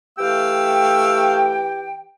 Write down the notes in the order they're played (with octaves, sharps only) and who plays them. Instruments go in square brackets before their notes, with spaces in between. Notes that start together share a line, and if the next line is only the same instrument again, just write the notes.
[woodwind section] E3 G4 G5 [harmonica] A3 F5 E6